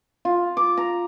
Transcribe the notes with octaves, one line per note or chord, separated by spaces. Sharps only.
F4
D6
A#5